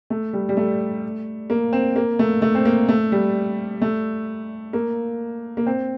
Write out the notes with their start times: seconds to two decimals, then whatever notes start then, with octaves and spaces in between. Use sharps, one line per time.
0.10 A3
0.33 G3
0.49 G3
0.57 A3
1.50 A#3
1.73 C4
1.96 A#3
2.19 A3
2.42 A3
2.55 C4
2.65 A#3
2.89 A3
3.12 G3
3.82 A3
4.73 A#3
5.57 A#3
5.67 C4